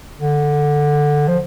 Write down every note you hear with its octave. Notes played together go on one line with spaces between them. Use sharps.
D3
F3